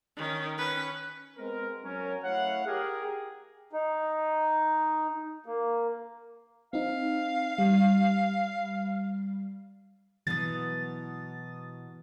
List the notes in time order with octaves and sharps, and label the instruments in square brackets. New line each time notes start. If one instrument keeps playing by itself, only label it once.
[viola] D#3 C#4
C#4 B4
[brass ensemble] G#3 B3 C4 A#4
F#3 C#4 A#4
A3 E4 C#5 F5 F#5
G4 G#4 A#4
[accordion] D#4
A#3
[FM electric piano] C4 D#4 [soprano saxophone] F5
[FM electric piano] G3
[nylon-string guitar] B2 F#3 [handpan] E3 [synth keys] D#6 A6